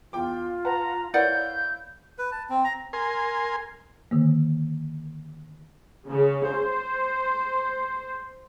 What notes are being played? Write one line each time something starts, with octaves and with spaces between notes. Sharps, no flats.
E2 F4 G5 D6
B4 F#5 A5 A#5
E4 A#4 B4 C#5 D5 F5 F#5 G6
B4
A5
C4
A#5
A#4 G#5 C6
D3 D#3 A#3
C#3
C5